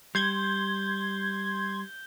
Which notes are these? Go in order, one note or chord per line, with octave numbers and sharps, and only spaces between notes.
G3 C6 G6 G#6 G7